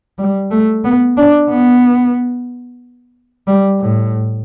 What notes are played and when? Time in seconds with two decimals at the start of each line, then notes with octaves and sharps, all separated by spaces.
0.18 G3
0.51 A3
0.84 B3
1.17 D4
1.50 B3
3.47 G3
3.80 A2